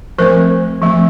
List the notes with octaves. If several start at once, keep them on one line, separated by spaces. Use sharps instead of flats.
F3 A3 C4 A#4 C5
F3 A3 C4